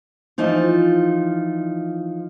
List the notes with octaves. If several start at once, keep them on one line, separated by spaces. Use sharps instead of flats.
E3 F3 D#4 F4